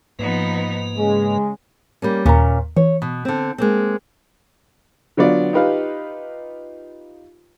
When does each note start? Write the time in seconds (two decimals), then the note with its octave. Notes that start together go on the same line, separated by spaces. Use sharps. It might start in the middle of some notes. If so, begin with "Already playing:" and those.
0.19 G#2 F3 A#3 B3 D#4 B4
0.96 C#3 G#3
2.02 G3 A#3 C#4
2.25 D#2 A#2 C#4 A#5
2.76 E3 C#5
3.02 B2
3.25 D3 C4
3.58 G#3 A#3 C4
5.17 D3 F#3 B3 F4 D5
5.53 D#4 F4 G4 B4 D#5 F5